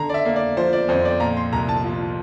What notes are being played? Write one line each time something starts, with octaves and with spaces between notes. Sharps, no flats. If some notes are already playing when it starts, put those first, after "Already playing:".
Already playing: D3 A#5
D5
E5
A#3
D5
F3 C5
D5
F2 C5
D5
A#2 A#5
C6
C2 A#5
A5
F3